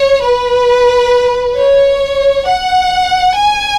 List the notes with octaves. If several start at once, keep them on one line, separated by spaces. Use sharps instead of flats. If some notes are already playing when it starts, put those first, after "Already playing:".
Already playing: C#5
B4
C#5
F#5
G#5